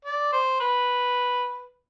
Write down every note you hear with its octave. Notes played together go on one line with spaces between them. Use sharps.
D5
C5
B4